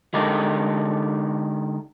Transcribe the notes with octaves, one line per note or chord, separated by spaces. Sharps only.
D3 G#3 D#4 G4 A4 A#4